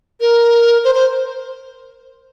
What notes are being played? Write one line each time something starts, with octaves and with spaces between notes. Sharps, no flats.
A#4
C5
C5